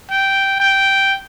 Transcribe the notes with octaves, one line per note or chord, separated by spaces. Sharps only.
G5
G5